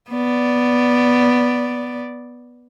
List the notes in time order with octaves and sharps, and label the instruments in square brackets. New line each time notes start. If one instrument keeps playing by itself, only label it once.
[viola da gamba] B3 D5